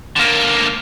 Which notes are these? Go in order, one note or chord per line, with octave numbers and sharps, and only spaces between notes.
D3 A#3